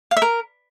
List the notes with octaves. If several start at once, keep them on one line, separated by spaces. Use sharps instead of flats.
F5
E5
A#4